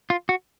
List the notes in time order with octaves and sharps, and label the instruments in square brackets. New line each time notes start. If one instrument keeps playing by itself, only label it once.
[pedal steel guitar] F4
F#4